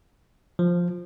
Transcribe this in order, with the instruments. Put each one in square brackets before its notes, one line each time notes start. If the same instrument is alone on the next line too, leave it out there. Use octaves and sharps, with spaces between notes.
[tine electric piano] F3